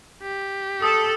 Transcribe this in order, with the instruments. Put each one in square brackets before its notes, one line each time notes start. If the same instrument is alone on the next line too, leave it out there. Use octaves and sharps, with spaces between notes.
[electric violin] G4
[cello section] A4 [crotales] D#6